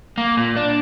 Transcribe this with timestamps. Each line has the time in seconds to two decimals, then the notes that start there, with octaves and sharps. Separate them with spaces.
0.18 A#3
0.37 A#2
0.57 D4